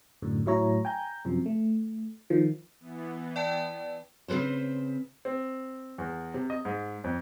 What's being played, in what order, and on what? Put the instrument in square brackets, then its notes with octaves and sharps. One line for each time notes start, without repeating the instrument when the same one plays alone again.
[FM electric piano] F#2 A2 D3
A2 F#3 E4 C#5 A#5
G5 G#5 A#5 G6
F#2 C3 F3
A3
D#3 F3
[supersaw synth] E3 B3
[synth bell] D5 G5 A5
[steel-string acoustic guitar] C#3 C4 A4 B4 C5
[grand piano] C4
E2
C3
D#5
G#2
F2